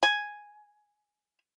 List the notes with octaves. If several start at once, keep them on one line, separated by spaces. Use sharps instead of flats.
G#5